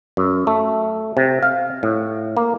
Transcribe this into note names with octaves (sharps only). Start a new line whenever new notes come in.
F#2
A3
C3
F5
A2
A#3